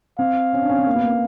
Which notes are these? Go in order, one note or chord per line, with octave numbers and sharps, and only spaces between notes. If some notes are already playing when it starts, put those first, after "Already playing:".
C4 F5
C#4
D4
C#4
C4
A#3
B3
A#3
B3